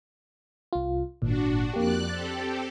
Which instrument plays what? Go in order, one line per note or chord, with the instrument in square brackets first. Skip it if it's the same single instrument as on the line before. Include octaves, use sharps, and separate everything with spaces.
[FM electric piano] C2 F4
[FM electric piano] G#1 A#2 [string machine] D4 F#4
[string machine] F2 D5 F#6 [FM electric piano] A#3 G4
[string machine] C4 G4 A4 [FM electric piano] A6